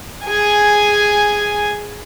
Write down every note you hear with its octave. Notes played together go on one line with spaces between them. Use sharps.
G#4 G#5